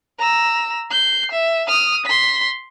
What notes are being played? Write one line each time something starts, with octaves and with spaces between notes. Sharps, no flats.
A#5 E6
G6 C7
E5
D#6 F6
C6 B6